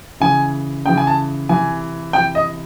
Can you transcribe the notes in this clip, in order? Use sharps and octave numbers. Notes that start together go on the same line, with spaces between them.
C#3 E3 G#5
C#3 E3 G5
G#5
A5
C3 E3 G#5
C3 E3 G5
D#5